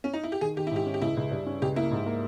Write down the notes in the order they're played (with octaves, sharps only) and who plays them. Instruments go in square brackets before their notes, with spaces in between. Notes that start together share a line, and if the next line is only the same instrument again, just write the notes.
[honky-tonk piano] C#4
D#4
E4
G4
[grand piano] D#3 [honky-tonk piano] G#4
[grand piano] D#3 [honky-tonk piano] G4
[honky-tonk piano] E4
[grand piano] G#2 [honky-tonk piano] G4
[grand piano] C#4
[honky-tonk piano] G4
[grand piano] C#2 [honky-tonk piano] E4
[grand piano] C#2
G2
C#4
[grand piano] C#2 [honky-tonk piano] G4
[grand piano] A#3 [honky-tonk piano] E4
[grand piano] G#2
A#3